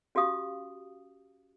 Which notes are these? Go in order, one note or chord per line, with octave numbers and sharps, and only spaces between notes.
C#4 F#4 G4 F5 D#6